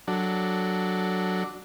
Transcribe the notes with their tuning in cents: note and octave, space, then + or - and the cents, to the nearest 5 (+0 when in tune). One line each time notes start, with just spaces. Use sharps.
F#3 +0 D4 +0 A4 +10